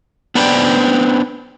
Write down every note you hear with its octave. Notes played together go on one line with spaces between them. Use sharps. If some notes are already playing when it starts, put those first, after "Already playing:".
B3 D4 B4 C5 D5 G5